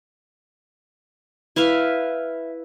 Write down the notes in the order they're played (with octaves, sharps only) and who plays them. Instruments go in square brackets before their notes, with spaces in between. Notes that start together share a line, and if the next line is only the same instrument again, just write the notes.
[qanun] E4 B4 E5 F5